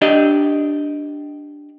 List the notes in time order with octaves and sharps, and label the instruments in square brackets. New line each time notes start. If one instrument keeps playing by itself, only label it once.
[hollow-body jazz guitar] D4 G4 D#5